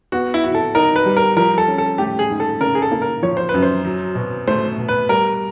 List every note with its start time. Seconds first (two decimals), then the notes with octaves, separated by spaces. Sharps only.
0.12 B3 F#4
0.34 E4
0.44 F#4
0.54 A4
0.75 D#4 A#4
0.96 B4
1.05 G3
1.17 A#4
1.37 F3 A#4
1.58 A4
1.68 C#4
1.78 A4
1.98 A3 G4
2.19 G#4
2.30 G#2
2.40 A4
2.60 C#3 A#4
2.75 G#4
2.82 A4
2.91 A#3
3.02 A#4
3.22 F3 C#5
3.37 C5
3.49 B4
3.54 F#2
3.63 C5
3.85 F#3
4.15 B2
4.47 A3 C5
4.78 B2
4.88 B4
5.09 G3 A#4